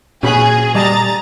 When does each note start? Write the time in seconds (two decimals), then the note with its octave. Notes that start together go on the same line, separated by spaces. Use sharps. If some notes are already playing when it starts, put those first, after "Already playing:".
0.23 A#2 C#4 F#4 G#4 B5
0.75 G3 D#5 A5 A#5 A6